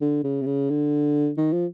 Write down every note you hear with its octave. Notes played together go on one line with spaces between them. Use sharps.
D3
C#3
C3
C#3
D3
D#3
F3